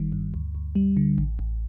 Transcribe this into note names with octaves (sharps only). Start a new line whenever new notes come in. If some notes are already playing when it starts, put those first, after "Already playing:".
Already playing: G1 D#3 G3
G2
D2
D2
G3
D3
A1
A1